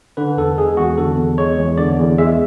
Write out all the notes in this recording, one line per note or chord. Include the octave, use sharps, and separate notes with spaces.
D3 B4
E2 A4
G#3 G#4
E2 F#4
D3 A4
E2
G#3 C#5
E2
D3 D5
E2
G#3 E5